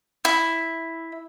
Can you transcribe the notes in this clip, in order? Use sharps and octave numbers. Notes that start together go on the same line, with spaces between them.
E4